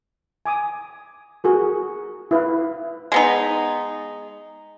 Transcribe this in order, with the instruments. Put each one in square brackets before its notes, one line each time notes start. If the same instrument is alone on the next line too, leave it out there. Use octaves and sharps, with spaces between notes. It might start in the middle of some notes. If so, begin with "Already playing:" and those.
[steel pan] G#5 D6 D#6
F#4 G#4 A#4
E4 B4 F5
[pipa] G#3 B3 D#4